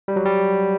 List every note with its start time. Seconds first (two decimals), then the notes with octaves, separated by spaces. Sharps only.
0.08 G3
0.16 F#3
0.26 G3